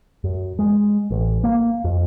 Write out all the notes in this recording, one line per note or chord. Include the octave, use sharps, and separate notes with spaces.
F#2
G#3
A1
A#3
F2